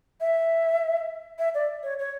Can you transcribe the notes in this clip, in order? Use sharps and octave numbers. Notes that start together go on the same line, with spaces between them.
E5
E5
D5
C#5
C#5